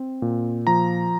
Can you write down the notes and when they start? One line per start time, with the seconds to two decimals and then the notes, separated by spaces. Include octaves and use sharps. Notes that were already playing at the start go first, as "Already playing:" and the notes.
Already playing: C4
0.22 A#2
0.67 F3 A#5